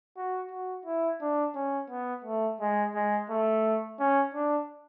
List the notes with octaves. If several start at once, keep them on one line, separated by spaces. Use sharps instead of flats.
F#4
F#4
E4
D4
C#4
B3
A3
G#3
G#3
A3
C#4
D4